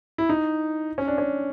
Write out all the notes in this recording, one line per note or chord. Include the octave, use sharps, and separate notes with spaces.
E4
D#4
C#4
D4
C#4